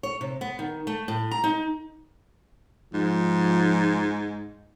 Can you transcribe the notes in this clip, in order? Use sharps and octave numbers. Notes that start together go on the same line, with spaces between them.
C#5
C3
B3
D#3
A3
A2
A#5
D#4
G#2 F3